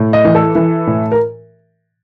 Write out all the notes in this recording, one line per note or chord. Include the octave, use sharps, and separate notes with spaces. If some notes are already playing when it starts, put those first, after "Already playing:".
Already playing: A2
D#5
E3
A4
E3
A2
A#4